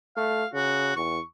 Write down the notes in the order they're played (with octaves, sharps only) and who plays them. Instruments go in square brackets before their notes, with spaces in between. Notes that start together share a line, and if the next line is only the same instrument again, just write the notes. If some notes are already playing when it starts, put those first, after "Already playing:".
[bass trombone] A3 [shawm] F5
[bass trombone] C#3 [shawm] F#4
[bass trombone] E2 [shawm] C#6